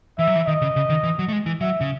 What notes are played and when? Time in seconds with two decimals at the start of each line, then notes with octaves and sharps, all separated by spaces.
0.19 E3 E5
0.27 F#3
0.36 E3
0.47 D#3 D#5
0.62 C#3
0.76 C#3
0.90 D#3
1.03 E3
1.19 F#3
1.28 A3
1.32 G#3
1.46 E3
1.61 F#3 E5
1.81 C#3